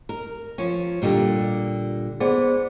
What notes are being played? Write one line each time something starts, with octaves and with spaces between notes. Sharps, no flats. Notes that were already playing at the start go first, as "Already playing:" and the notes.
A#4
F3 C#4
A#2 D3 G3
B3 G#4 C5 D5